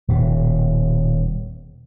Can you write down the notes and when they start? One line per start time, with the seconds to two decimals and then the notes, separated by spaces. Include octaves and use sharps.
0.08 D#1 B2